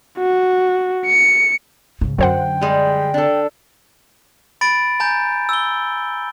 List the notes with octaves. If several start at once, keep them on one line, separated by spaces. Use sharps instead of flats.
F#4
C#7
G#2 C#3
F#2 D3 C5 F#5 G5
G3 G#3
D4 A4
B5 A6 D7
G#5 A#5 G6
E6 G7